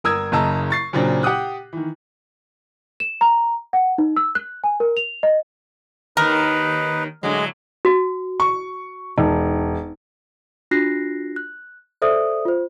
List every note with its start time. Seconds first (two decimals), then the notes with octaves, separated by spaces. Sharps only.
0.04 G1 A#4 D#6 E6 G#6
0.32 F#1 C#3 D#5 A5 A#5 E6
0.70 C#6 A6 C7
0.93 A#2 C#3 F#3 C4 D4
1.23 G4 F#5 D6 D#6 F#6
1.73 D#3 E3
3.00 E7
3.21 A#5
3.73 F#5
3.98 D#4
4.16 E6
4.35 F#6
4.64 G#5
4.80 A#4
4.97 F7
5.23 D#5
6.17 D#2 D#3 D#4 A#4 B4
7.23 A2 D3 F#3 G#3
7.85 F#4
8.40 C#6
9.18 E1 D#4
10.71 D4 F4 F#4 F#6 A#6 C7
11.36 F#6
12.02 A4 C5 D5 E5 D#6
12.45 F4 C5